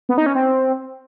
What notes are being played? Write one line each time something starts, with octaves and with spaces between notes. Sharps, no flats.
B3
D#4
C#4
C4